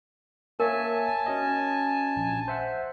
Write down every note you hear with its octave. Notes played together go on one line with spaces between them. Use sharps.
A#3 A#4 C#5 E5 G#5 A5
C#4 F#4 D#5
A#1
C5 E5 F#5